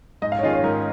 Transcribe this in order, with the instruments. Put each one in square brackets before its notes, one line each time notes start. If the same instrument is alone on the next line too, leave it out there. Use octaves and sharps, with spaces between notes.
[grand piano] G#2 [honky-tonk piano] D#5
[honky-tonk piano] F5
C#5
[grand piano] D#3 C#4 F4 G#4 [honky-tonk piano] D#5
[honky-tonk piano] C#5
[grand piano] G#2 [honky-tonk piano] A#4